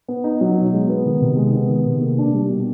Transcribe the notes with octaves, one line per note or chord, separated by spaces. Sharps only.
B3
D#4
F#3
B2
G#3
B3
D#3
C3
G#3
B3
D#3
C3
A#3
D4
G3
B2